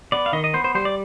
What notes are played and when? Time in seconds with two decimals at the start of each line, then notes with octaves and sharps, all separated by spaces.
0.12 B3 D5
0.26 F5
0.33 D#3 D#5
0.44 D#5
0.54 B3 C5
0.64 C5
0.75 G3 C5
0.85 D5